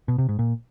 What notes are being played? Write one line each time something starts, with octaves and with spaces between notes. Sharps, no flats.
B2
C3
G#2
A#2